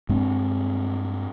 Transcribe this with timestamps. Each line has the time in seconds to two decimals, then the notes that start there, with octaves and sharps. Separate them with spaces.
0.09 G2 G#3 C4